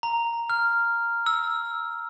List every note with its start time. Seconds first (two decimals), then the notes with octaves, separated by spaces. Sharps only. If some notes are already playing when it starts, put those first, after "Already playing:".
0.03 A#5
0.50 F6
1.26 E6